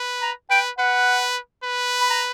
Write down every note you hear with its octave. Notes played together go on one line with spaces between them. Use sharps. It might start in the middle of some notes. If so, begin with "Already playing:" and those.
Already playing: B4
A#5
B4 G5
B4 F#5
B4
B5
A#5